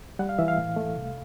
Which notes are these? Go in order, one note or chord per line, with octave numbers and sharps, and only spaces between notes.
G3 F#5
F5
E3 E5
F5
A2
A3
C2